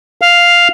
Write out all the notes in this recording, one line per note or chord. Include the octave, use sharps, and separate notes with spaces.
F5